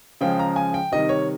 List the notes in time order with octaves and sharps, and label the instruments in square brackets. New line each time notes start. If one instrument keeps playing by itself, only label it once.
[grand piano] C#3 F3 G#3 G5
A#5
G#5
G5
C3 D#3 G3 D#5
C#5